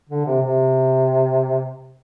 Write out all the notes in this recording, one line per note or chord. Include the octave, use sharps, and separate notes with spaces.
D3
C3
C3